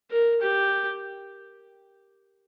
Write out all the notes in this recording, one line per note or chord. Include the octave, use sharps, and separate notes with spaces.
A#4
G4